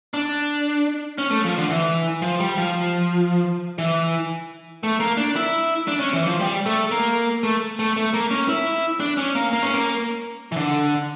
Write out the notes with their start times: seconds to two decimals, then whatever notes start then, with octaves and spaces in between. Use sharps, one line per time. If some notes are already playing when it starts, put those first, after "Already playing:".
0.14 D4
1.18 C#4
1.31 A3
1.44 F3
1.58 D3
1.70 E3
2.22 F3
2.40 G3
2.57 F3
3.78 E3
4.83 A3
5.00 A#3
5.17 D4
5.36 E4
5.88 D4
6.00 C#4
6.13 E3
6.26 F3
6.40 G3
6.66 A3
6.91 A#3
7.43 A3
7.79 A3
7.97 A3
8.13 A#3
8.31 C#4
8.48 E4
9.00 D4
9.17 C#4
9.35 A#3
9.53 A#3
9.63 C#4
9.73 A#3
10.52 E3
10.56 D3